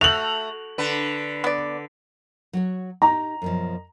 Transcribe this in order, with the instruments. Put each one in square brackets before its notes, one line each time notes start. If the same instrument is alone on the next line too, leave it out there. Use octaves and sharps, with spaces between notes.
[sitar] A3 [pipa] F#4 [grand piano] F7 F#7
[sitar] D3 B4
[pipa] B3 D5
[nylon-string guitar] F#3 F#4 C#5
[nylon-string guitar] D#4 G4 [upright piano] A#5
[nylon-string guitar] F#2 B2 F3